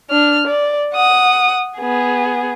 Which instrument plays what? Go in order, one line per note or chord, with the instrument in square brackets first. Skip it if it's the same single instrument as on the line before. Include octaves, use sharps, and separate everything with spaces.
[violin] D4 F6
D5
F#5 D#6
B3 G#4